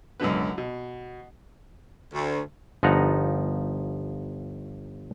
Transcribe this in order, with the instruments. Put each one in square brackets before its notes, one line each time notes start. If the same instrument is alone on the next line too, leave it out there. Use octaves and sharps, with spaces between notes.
[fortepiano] C#2 F#2 B2 D3 B4
B2
[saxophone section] D2
[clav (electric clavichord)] G1 F3 D#4 F#5 A#5